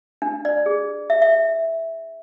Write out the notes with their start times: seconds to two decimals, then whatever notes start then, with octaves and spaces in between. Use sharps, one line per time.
0.22 D4
0.45 D5
0.66 G#4
1.10 E5
1.22 E5